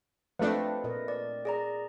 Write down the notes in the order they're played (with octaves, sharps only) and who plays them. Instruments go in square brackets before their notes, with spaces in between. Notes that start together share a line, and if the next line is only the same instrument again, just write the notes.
[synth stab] F3 A3 D4 [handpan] C4 F4 D#5 [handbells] B4
[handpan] A#2 A#4 D#5
[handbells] D5
G#4 D5 A#5